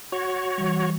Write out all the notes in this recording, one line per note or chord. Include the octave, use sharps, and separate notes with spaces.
F#4 C#5
E3 G3